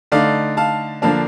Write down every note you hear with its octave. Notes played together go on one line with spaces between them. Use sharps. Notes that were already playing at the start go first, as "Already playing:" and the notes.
D3 A3 D#4 D5 F5
F5 A5
D3 F3 A#3 D4 F5 A5